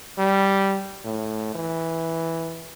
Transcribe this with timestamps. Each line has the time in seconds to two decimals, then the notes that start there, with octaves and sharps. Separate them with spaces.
0.18 G3
1.04 A2
1.55 E3